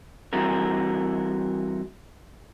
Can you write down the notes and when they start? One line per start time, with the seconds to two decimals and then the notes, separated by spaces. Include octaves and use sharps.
0.33 E3 G3 C4 E4 F#4 A#4